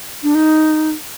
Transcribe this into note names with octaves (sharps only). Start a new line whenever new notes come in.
D4
D#4